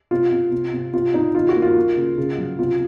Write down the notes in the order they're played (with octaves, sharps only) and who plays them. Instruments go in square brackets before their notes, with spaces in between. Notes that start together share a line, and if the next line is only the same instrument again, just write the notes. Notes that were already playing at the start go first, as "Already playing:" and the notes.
[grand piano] C3 F4
C3
C3
C3
C3 F4
C3 D#4
D#3 F4
F#4
A#3
F4
A#3
C#3
C#3
F#3
C3 F4